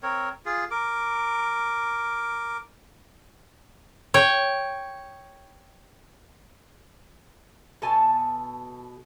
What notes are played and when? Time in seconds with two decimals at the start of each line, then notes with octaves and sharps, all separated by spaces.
0.03 C4 A#4 C#5
0.46 F4 G#4
0.71 A#4 D6
4.14 C#5 G5
7.82 B2 A4 G#5 A5